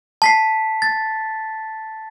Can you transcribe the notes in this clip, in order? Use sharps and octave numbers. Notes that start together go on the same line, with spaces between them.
A5 B6 C7
A6